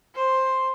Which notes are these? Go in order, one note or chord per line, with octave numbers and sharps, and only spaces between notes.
C5